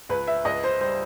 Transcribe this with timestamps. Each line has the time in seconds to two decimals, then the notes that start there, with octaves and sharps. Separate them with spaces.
0.09 C#2 B4
0.27 E5
0.45 C#2 D#5
0.64 C5
0.81 G3 C5